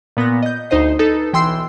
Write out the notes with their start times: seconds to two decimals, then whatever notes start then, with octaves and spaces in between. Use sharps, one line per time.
0.17 A#2 B3 B5 A#6
0.43 D#5 G6
0.70 D2 D#4 C5 D#5 C7
0.99 D#4 A4 B4
1.33 B1 E3 G5 C6 E6 C7